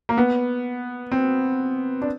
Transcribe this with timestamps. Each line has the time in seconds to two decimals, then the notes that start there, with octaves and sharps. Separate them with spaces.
0.09 A#3
0.17 B3
1.12 C4
2.02 D4